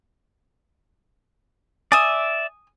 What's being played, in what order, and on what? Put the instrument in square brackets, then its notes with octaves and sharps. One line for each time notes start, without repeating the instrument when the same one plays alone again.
[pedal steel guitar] D5 E5 [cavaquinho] G#5 D#6